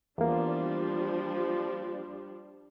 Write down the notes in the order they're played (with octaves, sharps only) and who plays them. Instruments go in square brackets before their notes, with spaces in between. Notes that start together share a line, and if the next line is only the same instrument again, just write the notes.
[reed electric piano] E2 A#3 [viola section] F3 G3 D4